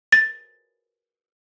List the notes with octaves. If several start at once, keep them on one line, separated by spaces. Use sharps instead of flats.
A6